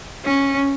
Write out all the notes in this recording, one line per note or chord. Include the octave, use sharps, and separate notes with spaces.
C#4